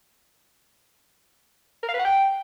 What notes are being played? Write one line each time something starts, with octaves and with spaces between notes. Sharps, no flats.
A#4
F5
B4
F#5
G5